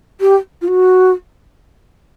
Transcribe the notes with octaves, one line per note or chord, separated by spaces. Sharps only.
G4
F4
F#4